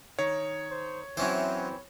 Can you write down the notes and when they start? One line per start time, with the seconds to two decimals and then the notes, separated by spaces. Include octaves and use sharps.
0.19 D#3 C#5
0.71 C5
1.17 E3 F#3 C4 C#4 E4 C5